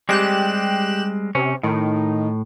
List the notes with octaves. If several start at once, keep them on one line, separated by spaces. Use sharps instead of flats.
G3 G#3 C4 G4 F#6 E7
C3 C#4
A2 D#3